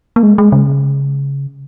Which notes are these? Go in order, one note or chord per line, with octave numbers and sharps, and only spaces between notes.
A#3
G#3
G#3
C#3